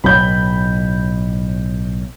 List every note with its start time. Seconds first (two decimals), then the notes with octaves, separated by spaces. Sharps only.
0.04 B1 A2 B5 G6